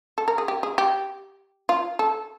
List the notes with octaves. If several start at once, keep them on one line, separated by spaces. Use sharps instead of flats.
A4
A#4
G#4
G4
G#4
G4
F4
A4